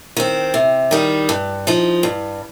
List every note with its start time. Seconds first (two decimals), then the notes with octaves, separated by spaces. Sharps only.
0.17 D#3 C4
0.54 C3
0.91 D#3 G3 D#4
1.29 G2
1.67 F3 D#4
2.03 G2